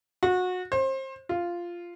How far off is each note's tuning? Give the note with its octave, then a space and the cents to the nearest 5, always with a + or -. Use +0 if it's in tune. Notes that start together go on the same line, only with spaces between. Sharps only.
F#4 -25
C5 +30
F4 -5